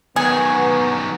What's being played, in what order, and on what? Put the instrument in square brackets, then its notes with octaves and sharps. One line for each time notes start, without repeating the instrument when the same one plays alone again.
[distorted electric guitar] D#3 F#3 [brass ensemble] B3 [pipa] G#4